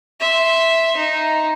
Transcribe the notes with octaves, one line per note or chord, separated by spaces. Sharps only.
E5 C6
D#4